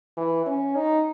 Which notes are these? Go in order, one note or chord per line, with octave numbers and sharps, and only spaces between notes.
E3
C#4
D#4